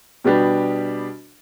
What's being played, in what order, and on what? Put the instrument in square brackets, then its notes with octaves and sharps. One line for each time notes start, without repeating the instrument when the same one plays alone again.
[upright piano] B2 G3 B3 D4 G4